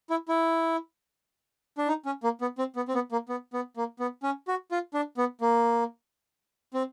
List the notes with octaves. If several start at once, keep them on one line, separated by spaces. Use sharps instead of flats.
E4
E4
D4
D#4
C#4
A#3
B3
C4
B3
C4
B3
A#3
B3
B3
A#3
B3
C#4
F#4
F4
D4
B3
A#3
C4